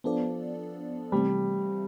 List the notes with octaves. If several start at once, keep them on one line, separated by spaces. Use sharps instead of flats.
F3 B3 D4 A4 D5
C3 E3 G3 A3 C4